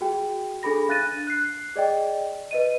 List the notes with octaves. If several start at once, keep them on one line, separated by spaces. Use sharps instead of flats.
F#4 G#4 G5
D4 G#4 A4 B5 A#6
D4 F5 F#6 A6 A#6 D#7
F#6 C7
G#4 D5 D#5 G5
B4 D#5 D#7